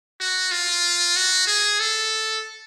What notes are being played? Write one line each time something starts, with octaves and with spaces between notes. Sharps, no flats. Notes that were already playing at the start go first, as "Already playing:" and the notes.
F#4
F4
F#4
G#4
A4